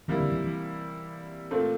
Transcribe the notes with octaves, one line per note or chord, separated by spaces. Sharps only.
C3 E3 G3 A#3 E4
D3
E3
E3
A#2 A3 C4